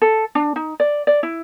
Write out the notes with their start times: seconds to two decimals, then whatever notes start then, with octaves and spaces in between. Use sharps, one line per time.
0.02 A4
0.35 D4
0.56 D#4
0.80 D5
1.07 D5
1.23 E4